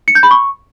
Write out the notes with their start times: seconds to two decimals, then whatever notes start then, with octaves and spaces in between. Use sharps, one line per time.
0.08 C#7
0.15 G6
0.23 B5
0.31 C#6